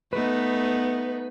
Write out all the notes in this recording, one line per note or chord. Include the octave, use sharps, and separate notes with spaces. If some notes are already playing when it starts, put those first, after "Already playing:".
A3 B3 D#4 B4